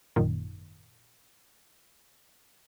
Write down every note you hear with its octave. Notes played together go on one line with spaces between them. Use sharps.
G#1 F#2 A#2 D#3